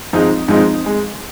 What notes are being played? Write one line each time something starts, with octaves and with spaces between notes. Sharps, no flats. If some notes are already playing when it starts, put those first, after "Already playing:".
G#2 F3 G#3 C4 D#4
G#2 F3 G#3 C4 D#4
G#3